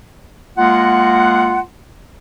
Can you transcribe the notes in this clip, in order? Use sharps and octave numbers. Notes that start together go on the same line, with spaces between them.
G#3 A#3 F4 F#5